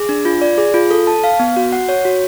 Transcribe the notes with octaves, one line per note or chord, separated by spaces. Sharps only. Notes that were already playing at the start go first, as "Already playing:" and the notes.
Already playing: G#4
D4
F4
D5
G#4
F4
A4
A5
F5
B3
F#4
F#5
C#5
F#4